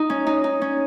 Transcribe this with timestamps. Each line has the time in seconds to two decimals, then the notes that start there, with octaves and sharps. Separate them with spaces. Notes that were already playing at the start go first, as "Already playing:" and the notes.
Already playing: D#4
0.10 C#4
0.27 D#4
0.44 D#4
0.61 C#4